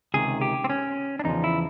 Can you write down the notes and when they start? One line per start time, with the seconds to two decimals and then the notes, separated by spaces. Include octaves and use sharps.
0.14 C#2 C3 D#3 G#4
0.41 G4
0.64 C4
0.70 C#4
1.19 D4
1.25 E2 C#3 F3 D#4
1.44 E4